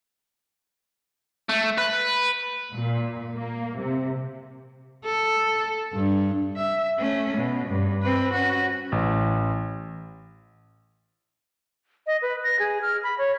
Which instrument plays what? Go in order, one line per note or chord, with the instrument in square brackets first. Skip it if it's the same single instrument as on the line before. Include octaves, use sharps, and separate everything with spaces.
[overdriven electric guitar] A3
B4
[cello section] A#2
A#3
C3
[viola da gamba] A4
G2
[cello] E5
A3 C#4
B2
G2
C4 B4
C#4 F#4
[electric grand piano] A1
[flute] D#5
B4
A#6
G#4
F6
B5
C#5